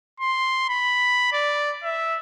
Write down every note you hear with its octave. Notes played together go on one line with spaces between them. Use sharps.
C6
B5
D5
E5